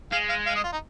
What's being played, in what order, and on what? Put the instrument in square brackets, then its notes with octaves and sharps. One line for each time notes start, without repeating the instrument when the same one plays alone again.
[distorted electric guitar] G#3 [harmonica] F5
[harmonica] F5
F5
D#5
F4
D#4